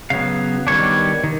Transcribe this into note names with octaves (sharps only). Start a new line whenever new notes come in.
C#3 F#3 B3 F5
D#3 G3 B3 D4 C#5
D#3